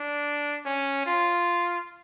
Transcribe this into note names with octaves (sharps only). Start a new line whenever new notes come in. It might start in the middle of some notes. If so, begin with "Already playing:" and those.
Already playing: D4
C#4
F4